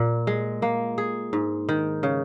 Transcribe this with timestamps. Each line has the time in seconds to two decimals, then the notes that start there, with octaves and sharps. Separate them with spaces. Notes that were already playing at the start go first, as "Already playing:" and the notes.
Already playing: A#2
0.27 G#3
0.62 A#3
0.98 G#4
1.33 G#2
1.69 D#3
2.03 C#3